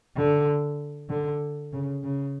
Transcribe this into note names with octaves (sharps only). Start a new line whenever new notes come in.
D3
D3
C#3
C#3